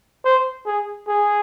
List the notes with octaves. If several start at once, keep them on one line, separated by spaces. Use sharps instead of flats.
C5
G#4
G#4